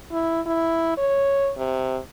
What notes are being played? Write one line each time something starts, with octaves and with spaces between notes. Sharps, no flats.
E4
E4
C#5
C3